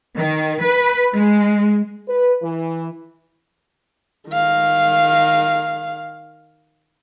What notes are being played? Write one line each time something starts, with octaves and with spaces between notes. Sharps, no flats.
D#3
B4
G#3
B4
E3
D#3 F5